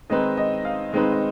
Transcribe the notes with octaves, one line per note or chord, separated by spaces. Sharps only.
D#3 G#3 C4 D#4 B4 D#5
D#5
F5
D#3 G#3 C4 D#4 B4 D#5
D#5